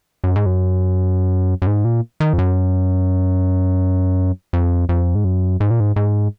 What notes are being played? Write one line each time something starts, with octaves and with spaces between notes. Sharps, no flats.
F#2
G#2
F#2
F#2
G#2
A#2
D#3
F2
F#2
F2
F2
G#2
F#2
G#2
A#2
G#2
G#2